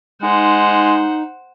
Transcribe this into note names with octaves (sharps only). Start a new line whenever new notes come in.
G#3 D#4 C5 F#5